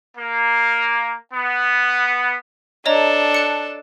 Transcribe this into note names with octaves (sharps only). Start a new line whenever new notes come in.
A#3
B3
D4 A4 C#5 D#5 A#5
A5 F#6 C#7